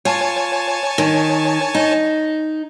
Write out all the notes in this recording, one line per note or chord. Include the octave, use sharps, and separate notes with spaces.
F4 C#5 G#5 A5
D#3
D#4